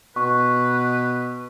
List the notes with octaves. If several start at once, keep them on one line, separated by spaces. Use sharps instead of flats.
B2 B4 C#6